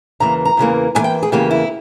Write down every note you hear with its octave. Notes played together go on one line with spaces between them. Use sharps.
E2 C#3 E3 A#3 A#5
A#5
E2 C#3 E3 A#3
E2 C#3 E3 A#3 G#5
G5
G#4
E2 C#3 E3 A#3 G4
E4